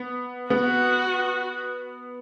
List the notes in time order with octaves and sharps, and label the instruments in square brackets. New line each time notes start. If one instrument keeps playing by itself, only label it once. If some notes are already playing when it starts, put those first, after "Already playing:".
Already playing: [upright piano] B3
[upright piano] B3 [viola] F#4